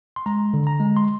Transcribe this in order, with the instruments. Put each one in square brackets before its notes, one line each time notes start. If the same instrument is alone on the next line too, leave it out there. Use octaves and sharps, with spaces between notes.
[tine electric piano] C6
G#3 A#5
D3
A#5
G#3
C6